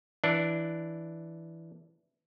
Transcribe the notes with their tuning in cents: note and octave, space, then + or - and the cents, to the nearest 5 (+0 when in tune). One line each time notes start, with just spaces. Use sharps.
E3 +0 D4 +0